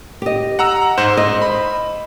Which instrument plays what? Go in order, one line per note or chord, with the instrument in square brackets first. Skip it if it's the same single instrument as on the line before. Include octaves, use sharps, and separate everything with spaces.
[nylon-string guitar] G4 D#5
[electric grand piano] F#5 A#5 E6
G#2 C5 E7
[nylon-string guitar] D#5
[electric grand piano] B5